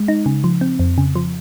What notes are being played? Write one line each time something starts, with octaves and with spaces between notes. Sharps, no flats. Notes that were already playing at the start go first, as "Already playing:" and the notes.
Already playing: G#3
D#4
C#3
F3
C4
F2
C#3
F3